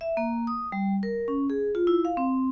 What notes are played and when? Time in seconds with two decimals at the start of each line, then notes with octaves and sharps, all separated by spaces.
0.01 E5
0.17 A#3
0.47 D#6
0.72 G3
1.03 A#4
1.28 C#4
1.50 G#4
1.75 F4
1.87 E4
2.05 F5
2.17 C4